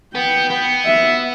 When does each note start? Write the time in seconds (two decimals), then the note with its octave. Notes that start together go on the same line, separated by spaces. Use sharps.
0.15 B3 G5
0.50 B3
0.85 E5